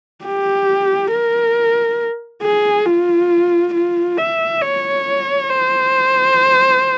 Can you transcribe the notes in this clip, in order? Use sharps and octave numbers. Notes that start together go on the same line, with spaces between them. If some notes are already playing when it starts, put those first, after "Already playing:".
G4
A#4
G#4
F4
F4
E5
C#5
C5